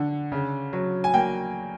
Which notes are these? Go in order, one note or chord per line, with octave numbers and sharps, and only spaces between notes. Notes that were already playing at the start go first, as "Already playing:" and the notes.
Already playing: D3 F#5
C#3
F#3
G#5
A#3 G5